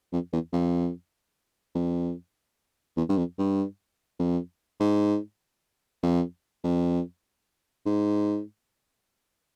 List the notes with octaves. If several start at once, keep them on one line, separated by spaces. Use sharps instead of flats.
F2
E2
F2
F2
E2
G2
F2
G2
F2
G#2
F2
F2
G#2